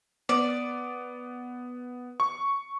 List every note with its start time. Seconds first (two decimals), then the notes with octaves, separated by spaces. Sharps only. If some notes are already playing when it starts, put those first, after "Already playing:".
0.29 B3 D5
2.20 C#6